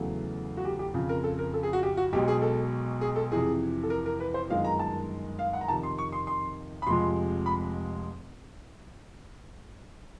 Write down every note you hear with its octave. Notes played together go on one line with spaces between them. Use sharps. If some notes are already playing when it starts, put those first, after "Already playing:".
Already playing: E2 C#3 F#3 A3
F#4
G4
G4
F2 C#3 F3
A#4
A4
A#4
A4
G#4
F#4
G4
F#4
B1 B2 G#3 G4
G#4
A4
G#4
A4
F2 C3 E3 G#4
A4
A#4
A#4
B4
C5
G1 F#2 D#3 G#3 F5
A#5
A5
F5
F#5
A#5
F2 C3 D#3 A5
C6
C#6
C6
C6
B5
F1 F2 C3 F3 G#3 C6
B5